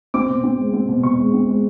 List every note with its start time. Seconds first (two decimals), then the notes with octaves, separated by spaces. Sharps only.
0.14 C4 D6
0.29 B2
0.44 C4
0.59 G#3
0.73 C4
0.88 B2
1.03 B2 C#6
1.19 G#3
1.34 C4
1.49 G#3